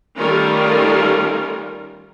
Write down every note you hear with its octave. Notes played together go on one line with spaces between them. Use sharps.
D#3 G3 A3 C#4 F4 A#4